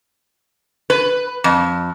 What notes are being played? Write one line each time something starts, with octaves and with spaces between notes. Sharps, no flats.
B4
F2